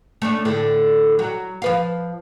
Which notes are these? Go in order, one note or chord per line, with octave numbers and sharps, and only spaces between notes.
A3 C#4 D4
A2 D3 A4
F#3
F3 B4 F5